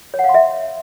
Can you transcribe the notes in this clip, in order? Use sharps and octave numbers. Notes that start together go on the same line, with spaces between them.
C#5
F#5
F5
C6
E5